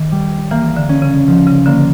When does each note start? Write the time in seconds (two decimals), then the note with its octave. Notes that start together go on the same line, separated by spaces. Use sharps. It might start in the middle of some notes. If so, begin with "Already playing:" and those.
Already playing: D#3
0.12 G3
0.51 E3 A#3
0.76 D3
0.89 C#4
1.02 C#3
1.28 F3
1.47 C#3
1.66 D3 A#3